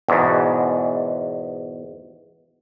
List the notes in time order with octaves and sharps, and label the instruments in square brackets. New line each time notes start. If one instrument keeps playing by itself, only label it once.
[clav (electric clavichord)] E2 G#2 B2